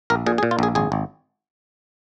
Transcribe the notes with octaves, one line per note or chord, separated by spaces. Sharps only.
A#1 A#4
A#2 G#4
G#4
A#2
F4
A#1 G#4
G#1 G#4
G#1